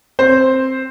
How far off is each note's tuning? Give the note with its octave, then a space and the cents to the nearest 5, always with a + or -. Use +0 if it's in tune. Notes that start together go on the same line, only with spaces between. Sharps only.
C4 +10 C5 +0